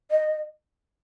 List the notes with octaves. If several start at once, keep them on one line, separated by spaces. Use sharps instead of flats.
D#5